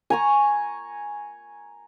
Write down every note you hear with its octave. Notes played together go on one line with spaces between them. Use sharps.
G#5 A#5 C#6